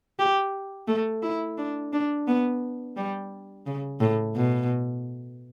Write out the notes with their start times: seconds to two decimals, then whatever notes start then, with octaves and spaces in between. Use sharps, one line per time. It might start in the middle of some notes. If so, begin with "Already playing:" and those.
0.19 G4
0.87 A3
1.23 E4
1.58 D4
1.93 D4
2.28 B3
2.97 G3
3.67 C#3
4.00 A2
4.36 B2